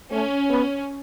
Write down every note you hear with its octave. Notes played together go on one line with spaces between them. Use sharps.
A3 C#4
B3